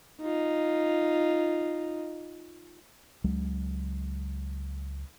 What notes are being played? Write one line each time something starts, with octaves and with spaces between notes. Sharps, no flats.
D#4 F4
C#2 F#3 G#3